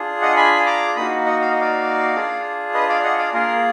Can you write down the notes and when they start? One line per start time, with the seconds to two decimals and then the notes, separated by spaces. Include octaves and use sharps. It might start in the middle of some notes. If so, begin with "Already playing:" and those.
Already playing: D4 F4 G#4
0.22 D#5 F#5
0.37 G#5 B5
0.66 A#5 D6
0.96 A#3 D#4 F#4 B5 D#6
1.26 D#5 F#5
1.41 F5
1.51 D#5
1.61 D5 F5
2.15 D4 F4 G#4
2.74 B4 D#5
2.89 D5 F5
3.04 D#5 F#5
3.18 D5 F5
3.33 A#3 F4 G#4 A#4